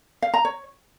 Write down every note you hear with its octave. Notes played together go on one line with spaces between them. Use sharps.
F5
A#5
C#5